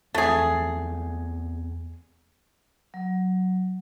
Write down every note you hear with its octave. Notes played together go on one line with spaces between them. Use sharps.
E2 A3 C4 G#4
F#3